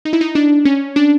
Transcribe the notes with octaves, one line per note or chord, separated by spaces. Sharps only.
D#4
E4
D#4
D4
C#4
D4